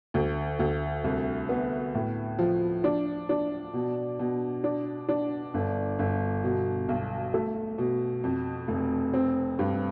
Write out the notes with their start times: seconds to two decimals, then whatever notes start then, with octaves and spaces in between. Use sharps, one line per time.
0.14 D2
0.59 D2
1.04 C2
1.49 B3
1.95 A2
2.39 F3
2.84 D4
3.29 D4
3.73 B2
4.19 B2
4.64 D4
5.09 D4
5.54 G1
5.99 G1
6.43 B2
6.89 B1
7.34 A3
7.78 B2
8.24 F2
8.68 F1
9.14 C4
9.59 G2